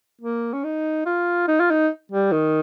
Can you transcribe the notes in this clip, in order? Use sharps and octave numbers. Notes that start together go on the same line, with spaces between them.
A#3
C#4
D#4
F4
D#4
F4
D#4
G3
D#3